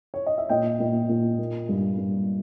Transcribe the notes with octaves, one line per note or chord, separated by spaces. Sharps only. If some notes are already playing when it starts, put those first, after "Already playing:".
C#5
D#5
E5
A#2 D#5 G5
A#2
A#2
A#3
G2
G2